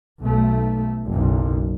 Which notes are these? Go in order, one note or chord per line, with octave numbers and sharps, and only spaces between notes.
B1 A3
F#1 B1